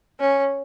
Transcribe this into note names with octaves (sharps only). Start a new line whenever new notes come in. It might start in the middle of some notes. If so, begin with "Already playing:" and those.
C#4